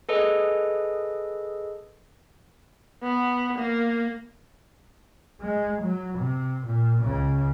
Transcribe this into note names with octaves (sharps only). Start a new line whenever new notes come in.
G#4 A4 B4 D#5
B3
A#3
G#3
F#3
C3
A#2
C#2 C#3